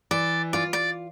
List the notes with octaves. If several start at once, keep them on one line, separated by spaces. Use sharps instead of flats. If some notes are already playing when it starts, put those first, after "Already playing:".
E3 D5
F4 D5
D5